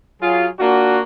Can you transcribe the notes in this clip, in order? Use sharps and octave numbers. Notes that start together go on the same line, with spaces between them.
F#3 F4 G#4
A#3 D4 F4 F#4